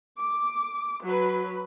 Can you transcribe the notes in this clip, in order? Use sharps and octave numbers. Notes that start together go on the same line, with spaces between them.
D6
F#3 B4